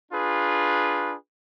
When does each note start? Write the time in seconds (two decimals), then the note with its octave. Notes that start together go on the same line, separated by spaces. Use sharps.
0.12 D4 F4 G#4 B4